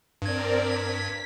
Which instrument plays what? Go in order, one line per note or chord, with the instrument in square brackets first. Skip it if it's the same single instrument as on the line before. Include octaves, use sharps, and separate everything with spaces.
[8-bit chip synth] G2 G#6 [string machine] C4 A#4 D5
[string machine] B6